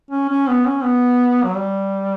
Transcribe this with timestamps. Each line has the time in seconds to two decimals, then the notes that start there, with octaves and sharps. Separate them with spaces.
0.11 C#4
0.29 C#4
0.48 B3
0.66 C#4
0.83 B3
1.44 F#3
1.56 G3